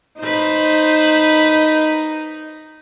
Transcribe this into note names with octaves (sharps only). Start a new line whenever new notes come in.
D#4 B4 C5